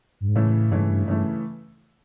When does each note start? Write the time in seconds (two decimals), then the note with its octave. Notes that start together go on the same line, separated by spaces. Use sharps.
0.20 G2
0.28 G#2
0.35 A2 C#3 E3 A3
0.71 G2 C#3 E3 A3
0.80 G#2
0.89 G2
1.07 G2 C#3 E3 A3